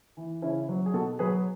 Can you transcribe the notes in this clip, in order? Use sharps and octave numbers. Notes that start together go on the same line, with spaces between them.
E3
C#3 C#4 E4
F#3
G#4
B2 F#4 A4
F#3 G#4 B4